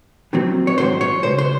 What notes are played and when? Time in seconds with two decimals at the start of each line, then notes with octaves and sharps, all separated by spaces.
0.33 D#2 D#3 F#3 C4
0.67 C#5
0.78 G#2 D#3 F#3 C5
1.01 C#5
1.23 C#2 C#3 C5
1.38 C5